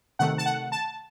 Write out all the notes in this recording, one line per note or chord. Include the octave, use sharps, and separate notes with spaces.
C3 D#3 A3 F#5
A5
F#5
A5